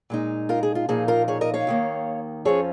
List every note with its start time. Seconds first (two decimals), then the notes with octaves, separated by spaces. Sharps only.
0.10 A#2 G#3 D#4
0.49 F4 A#4
0.63 G#4
0.75 F4
0.89 A#2 F3 A#3 D#4 G#4
1.08 F4 A#4
1.28 G#4 C#5
1.41 A#4 D#5
1.54 C#5 F5
1.67 D#2 D#3 A#3
2.45 F2 F3 C#4 G#4 C#5